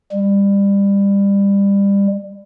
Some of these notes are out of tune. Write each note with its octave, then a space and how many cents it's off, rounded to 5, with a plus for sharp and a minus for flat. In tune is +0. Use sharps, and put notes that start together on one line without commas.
G3 +25